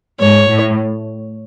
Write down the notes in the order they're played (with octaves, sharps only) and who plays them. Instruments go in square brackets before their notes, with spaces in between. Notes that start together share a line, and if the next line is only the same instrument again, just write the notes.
[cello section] G#2 [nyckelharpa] C#5
[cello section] A2